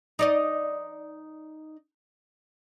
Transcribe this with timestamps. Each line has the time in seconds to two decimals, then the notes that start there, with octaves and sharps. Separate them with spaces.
0.19 D#4 D5 D#5